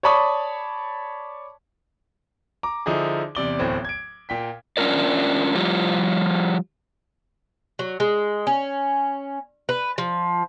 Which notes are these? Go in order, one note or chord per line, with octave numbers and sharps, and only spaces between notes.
C#5 D5 A5 B5 C#6 D#6
A#5 D6
D3 F3 D#4 E4 G#4
E2 C3 D5 G7
D1 E2 A2 C4
G#6 D7
A#2 G5 B6
C#4 D4 F4 A#4 D5
F3 G3 F4 G4
F#3
G#3
C#4
B4
F3